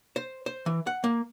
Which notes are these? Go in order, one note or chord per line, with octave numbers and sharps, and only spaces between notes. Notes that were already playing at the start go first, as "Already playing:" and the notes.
C5
C5
E3
F#5
A#3